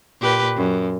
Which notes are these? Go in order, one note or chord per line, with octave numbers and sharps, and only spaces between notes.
A#2 G4 B4
F#2